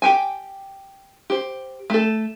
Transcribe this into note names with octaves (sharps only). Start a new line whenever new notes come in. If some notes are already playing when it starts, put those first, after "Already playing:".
G4 G5 G#5
G4 C5
A3 A4